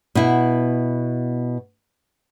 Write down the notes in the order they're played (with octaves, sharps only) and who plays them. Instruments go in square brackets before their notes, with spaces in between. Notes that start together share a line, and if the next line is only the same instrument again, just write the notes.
[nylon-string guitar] B2 E4